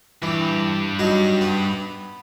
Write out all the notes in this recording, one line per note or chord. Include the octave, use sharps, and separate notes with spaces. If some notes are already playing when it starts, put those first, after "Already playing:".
G2 E3 G4
F#3 G3 D#4
B3